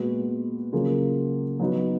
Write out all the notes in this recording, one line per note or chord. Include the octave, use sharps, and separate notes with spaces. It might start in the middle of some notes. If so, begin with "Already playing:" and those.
Already playing: A#2 G#3 B3 F#4
C#3 F#3 A#3 F4 G#4
F#3 B3 D#4 F#4